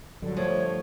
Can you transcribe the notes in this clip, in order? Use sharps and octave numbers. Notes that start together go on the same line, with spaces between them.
G2 D3 F#3 A4
F3 A3 C#5